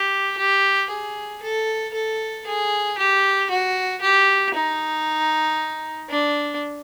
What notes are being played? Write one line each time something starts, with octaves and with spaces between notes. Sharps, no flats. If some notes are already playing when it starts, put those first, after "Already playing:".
Already playing: G4
G4
G#4
A4
A4
G#4
G4
F#4
G4
D#4
D4